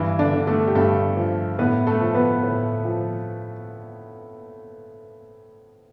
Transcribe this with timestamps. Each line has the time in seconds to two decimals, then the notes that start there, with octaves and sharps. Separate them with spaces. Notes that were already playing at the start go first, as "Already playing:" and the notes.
Already playing: G2 E3 E4
0.19 D3 D4
0.33 D3
0.47 A3 A4
0.67 G4
0.75 G2 A3 A4
1.17 F3
1.59 A2 B3 B4
1.87 A3 A4
2.00 F3
2.15 B3 B4
2.43 A2
2.85 F3